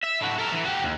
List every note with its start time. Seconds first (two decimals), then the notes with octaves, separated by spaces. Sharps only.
0.03 E5
0.21 A2 F#4
0.38 A4 A#4
0.52 E3
0.64 F#4 G4
0.84 D#2